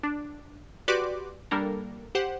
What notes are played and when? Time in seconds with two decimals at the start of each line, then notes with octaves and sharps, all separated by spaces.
0.03 D4
0.88 F#4 G4 B4 D5 C6 D6
1.51 G3 A#3 D4 A4 A#4
2.15 G4 C5 F#5